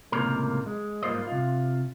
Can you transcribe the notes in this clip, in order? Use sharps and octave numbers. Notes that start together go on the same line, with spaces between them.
C#2 F#2 A2 C3 A#3 A#4
G#3
G#2 G3 A#3 F4 C5 D#5
C3 F4